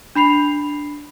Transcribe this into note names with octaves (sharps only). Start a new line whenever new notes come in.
D4 B5 C7 F7